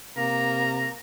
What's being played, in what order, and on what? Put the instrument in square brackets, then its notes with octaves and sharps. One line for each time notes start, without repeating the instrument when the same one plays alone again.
[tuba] C3 [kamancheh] A#3 [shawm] A#5